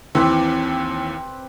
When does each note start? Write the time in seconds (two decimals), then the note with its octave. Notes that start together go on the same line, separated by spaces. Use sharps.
0.15 D#2 E3 C4 B4 D6